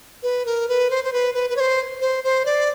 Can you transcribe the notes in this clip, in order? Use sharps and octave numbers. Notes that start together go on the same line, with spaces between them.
B4
A#4
B4
C5
C5
B4
B4
B4
C#5
C5
C5
C5
D5